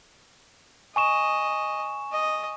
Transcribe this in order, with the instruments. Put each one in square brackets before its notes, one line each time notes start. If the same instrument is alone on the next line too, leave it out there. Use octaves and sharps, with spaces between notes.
[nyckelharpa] D#5 [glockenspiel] G#5 C#6 E7
[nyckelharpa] D#5